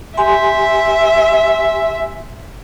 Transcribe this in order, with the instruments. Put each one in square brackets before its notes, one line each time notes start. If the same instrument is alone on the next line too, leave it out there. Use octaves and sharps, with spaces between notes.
[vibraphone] G4 G#5 C6 [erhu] E5